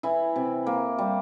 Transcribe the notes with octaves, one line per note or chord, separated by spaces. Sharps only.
E3 E4
C3
A#3
G3